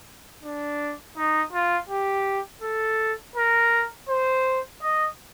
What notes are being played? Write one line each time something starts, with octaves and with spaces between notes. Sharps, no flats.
D4
D#4
F4
G4
A4
A#4
C5
D#5